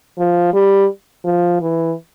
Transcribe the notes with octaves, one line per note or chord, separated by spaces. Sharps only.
F3
G3
F3
E3